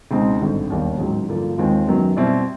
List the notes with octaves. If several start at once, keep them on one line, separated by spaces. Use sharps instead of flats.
C#2 B2 G#3 C4 D#4
G#1 G2 D3
E1 D#2 D#3 G3 A#3
A1 G#2 D#3 F#3
G2 D3 F3 A#3
D#2 D#3 G#3 C4 F4
F#2 D#3 F#3 B3
B2 G3 C4 E4